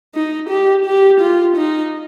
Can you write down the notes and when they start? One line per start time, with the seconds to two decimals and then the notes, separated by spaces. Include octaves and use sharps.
0.15 D#4
0.50 G4
0.86 G4
1.20 F4
1.57 D#4